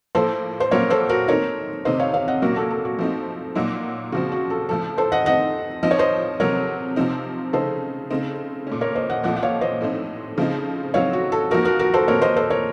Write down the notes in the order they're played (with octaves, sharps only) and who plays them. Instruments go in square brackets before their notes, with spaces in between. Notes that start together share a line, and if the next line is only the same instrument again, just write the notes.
[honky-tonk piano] A2 F3 A#3 [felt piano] A4 C5
[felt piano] C5
[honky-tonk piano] A#2 F#3 A#3 C#4 [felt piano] A#4 C#5
[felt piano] A4 C5
F#4 A#4
[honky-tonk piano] D#3 A3 C4 D#4 [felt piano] A#4 C#5
[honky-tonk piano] C3 D#3 A3 [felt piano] C5 D#5
[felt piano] C#5 F5
C#5 F5
D#5 F#5
[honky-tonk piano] A#2 F#3 A#3 C#4 [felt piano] F#4 A#4
[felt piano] A4
A4
F#4
[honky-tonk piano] F3 A3 C4 D#4
A#2 F#3 A#3 D#4
[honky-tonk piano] C#3 F3 C4 [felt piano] F#4
[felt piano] F#4
A4
[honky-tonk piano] A2 F3 A3 [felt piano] A4
[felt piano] A4 C5
D#5 F#5
[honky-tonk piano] D#3 A3 C4 D#4 [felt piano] D#5 F#5
[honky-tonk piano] F3 C4 D#4 [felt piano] D#5
[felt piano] C#5
C5 D#5
[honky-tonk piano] C3 F#3 A3 [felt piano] A#4 C#5
[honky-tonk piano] C3 F3 C4 D#4
[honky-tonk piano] C#3 A3 D#4 [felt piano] A4 C5
[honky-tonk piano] C#3 A3 C4 D#4
A#2 A3 C#4
[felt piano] A#4 C#5
C5 D#5
D#5 F#5
[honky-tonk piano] A#2 F3 A3 [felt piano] D#5 F#5
[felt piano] F#5
C#5 F5
C5 D#5
[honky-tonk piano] A2 A3 C4 D#4
C#3 F3 A3 C4 D#4
[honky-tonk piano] A2 F#3 C4 D#4 [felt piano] C#5 F5
[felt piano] F#4
A4
[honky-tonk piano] F3 A#3 D#4 [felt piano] F#4 A#4
[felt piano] F#4 A#4
F#4 A#4
A4 C5
[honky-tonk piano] A#2 A3 C4 [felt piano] A#4 C#5
[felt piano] C5 D#5
A4 C5
A#4 C#5